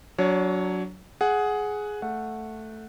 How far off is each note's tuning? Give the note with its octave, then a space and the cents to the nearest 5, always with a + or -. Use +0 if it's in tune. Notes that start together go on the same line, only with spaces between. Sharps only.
F#3 +0 D4 -25 C#5 +0
G#4 +10 F#5 +0
A3 +0 F#5 -10